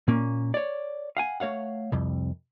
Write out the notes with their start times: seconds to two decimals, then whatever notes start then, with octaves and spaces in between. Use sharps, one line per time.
0.08 A#2 A#3 C#4
0.54 C#5 D5
1.17 F5 F#5 G#5
1.40 A3 C#5 F5 F#5
1.92 C2 F2